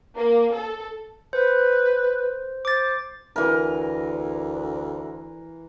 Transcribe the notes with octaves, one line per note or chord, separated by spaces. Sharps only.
A#3
A4
B4 C5
C5 D6 A6
D2 E3 A#4